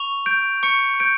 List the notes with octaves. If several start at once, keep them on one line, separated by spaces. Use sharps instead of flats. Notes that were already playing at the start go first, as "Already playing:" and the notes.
Already playing: C#6 F7
G6 D7
C#6 C#7
G6 D7